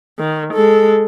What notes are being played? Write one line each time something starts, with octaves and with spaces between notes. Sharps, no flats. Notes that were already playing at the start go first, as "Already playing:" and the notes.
D#3
G#3 A4